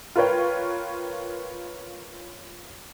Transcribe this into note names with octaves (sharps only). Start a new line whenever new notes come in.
F4 A#4 B4 C#5 G5